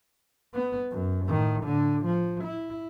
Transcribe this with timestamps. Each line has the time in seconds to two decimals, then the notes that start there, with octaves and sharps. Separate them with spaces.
0.54 B3
0.91 F#2
1.27 A2 D#3
1.64 A2 D3
2.05 F3
2.45 E4